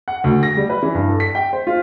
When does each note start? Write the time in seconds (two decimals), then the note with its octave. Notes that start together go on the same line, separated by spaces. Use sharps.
0.08 F#5
0.24 D2
0.43 A#6
0.57 G3
0.70 B4
0.83 E3
0.95 G2
1.09 A4
1.20 B6
1.35 G5
1.53 C5
1.67 F4